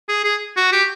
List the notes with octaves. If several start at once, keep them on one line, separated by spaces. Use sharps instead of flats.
G#4
G#4
F#4
G4